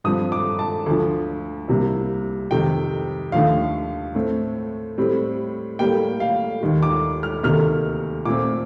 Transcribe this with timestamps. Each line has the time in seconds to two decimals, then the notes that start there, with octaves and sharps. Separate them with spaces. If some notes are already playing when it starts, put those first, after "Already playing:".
0.04 G2 F3 C4 D#6
0.32 D6
0.59 A5
0.86 D2 D3 F3
1.68 C2 C3 G3 A#3
2.51 F2 C3 D#3 G5
3.32 D#2 D3 F3 A3 F5
4.15 A2 A3 C4
4.98 A2 G3 C4
5.79 A2 G3 A#3 G5
6.20 F5
6.61 D#2 D#3 G3
6.83 D6
7.23 F6
7.43 D2 C3 D#3 A#3 F6
8.25 A#2 A3 C4 D6